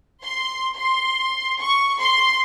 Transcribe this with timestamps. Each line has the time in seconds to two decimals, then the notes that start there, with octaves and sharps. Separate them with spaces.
0.23 C6
0.76 C6
1.60 C#6
2.00 C6